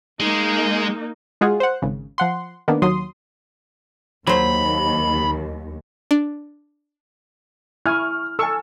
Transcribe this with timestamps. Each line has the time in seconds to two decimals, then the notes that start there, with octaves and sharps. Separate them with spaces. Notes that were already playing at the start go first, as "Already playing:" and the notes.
0.21 G#3 A#3 D#4
1.41 G#3 F4 F#4 G#4
1.60 C5 F#5
1.82 G#1 C#3
2.18 F3 F#5 C6
2.68 D#3 A#3 B3 D4
2.82 D#2 F#3 C6 D#6
4.27 D#2 F#3 C5 B5
6.11 D4
7.86 E4 G#5 C#6 F6
8.39 A4 G#5 C#6 E6